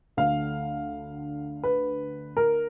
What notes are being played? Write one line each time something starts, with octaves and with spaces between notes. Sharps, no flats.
D2 D3 F5
B4
A#4